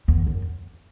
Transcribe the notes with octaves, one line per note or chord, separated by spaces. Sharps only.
E2
F#2